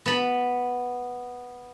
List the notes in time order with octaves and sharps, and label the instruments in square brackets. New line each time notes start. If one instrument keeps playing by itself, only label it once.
[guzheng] B3 A5 B5